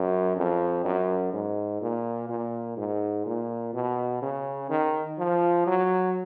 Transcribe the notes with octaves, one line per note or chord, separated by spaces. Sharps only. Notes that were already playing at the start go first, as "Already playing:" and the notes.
Already playing: F#2
F2
F#2
G#2
A#2
A#2
G#2
A#2
B2
C#3
D#3
F3
F#3